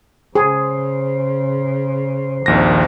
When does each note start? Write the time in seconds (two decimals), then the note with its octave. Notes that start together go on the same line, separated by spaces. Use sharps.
0.35 C#3 G#4 C5
2.46 A#1 D#2 D#3 C4 A#6